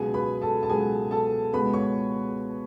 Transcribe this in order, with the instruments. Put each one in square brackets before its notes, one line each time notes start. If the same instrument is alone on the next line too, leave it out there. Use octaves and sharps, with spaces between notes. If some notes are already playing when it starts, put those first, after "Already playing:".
Already playing: [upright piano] C#2 B2 F#3 B3 G#4 G#5
B4 B5
A4 A5
A5
C#2 B2 F#3 B3 G#4 G#5
A4 A5
C#2 B2 G#3 B3 B4 B5
C#5 C#6